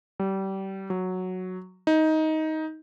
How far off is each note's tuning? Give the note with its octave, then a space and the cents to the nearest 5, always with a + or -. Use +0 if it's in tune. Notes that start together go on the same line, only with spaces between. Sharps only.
G3 -25
F#3 -5
D#4 +15